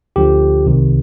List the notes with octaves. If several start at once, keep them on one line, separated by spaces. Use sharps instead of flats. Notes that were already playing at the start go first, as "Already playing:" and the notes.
D2 D3 F3 G4
C2 C3 D#3